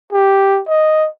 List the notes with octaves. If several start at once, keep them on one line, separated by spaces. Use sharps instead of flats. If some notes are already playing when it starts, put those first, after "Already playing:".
G4
D#5